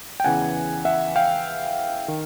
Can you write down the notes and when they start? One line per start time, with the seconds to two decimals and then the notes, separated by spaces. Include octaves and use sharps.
0.20 G5
0.24 E2 C#3 E3 F#5 G#5
0.85 E5 F#5
1.16 F5 G5
2.08 D#3